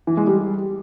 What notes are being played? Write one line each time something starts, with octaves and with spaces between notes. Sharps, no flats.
E3
G#3
G3